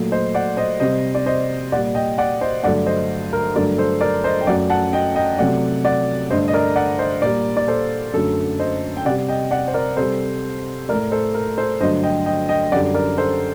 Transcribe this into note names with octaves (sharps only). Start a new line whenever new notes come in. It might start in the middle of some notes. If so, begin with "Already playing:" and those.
Already playing: A#2 F#3 A3
C5 D#5
D5 F#5
C5 D#5
C3 G3 C5 D#5
D5
C5 D#5
A#2 G3 D5 F#5
D#5 G5
D5 F#5
C5 D#5
G2 D3 F#3 A3 D5 F#5
C5 D#5
A#4
G2 D3 F#3 A3 A#4 D5
A4 C5
A#4 D5
C5 D#5
G5
F#2 F#3 A3 D5 F#5
F#5 A5
D#5 G5
D#5 G5
C3 F#3 A3 D5 F#5
D5 F#5
G2 D3 A3 C5 D#5
D#5
A#4 D5
D5 F#5
C5 D#5
A#2 G3 A#4 D5
D5
A4 C5
F#2 D3 F#3 A3 A4
C5 D#5
G5
C3 G3 D5 F#5
D#5 G5
D5 F#5
C5
A#4 D5
C3 G3 A4 C5
A2 A3 A#4 D5
A4 C5
A#4
A4 C5
G2 D3 F#3 A3 C5 D#5
D#5 G5
D#5 G5
D#5 G5
F#2 D3 G3 D5 F#5
A#4 D5
A4 C5